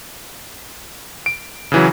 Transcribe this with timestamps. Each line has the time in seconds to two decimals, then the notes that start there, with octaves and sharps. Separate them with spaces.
1.26 D7
1.72 C#3 E3 F#3